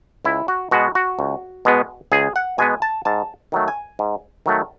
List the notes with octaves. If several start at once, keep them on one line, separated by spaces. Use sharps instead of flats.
C#2 E4
F#4
B2 G#3 B3 F#4
F#4
C#2
B2 G#3 B3
C#2 G#4
F#5
B2 G#3 B3 G#5
A5
G#2 A5
D#3 F#3 A3
G#5
G#2
D#3 F#3 A3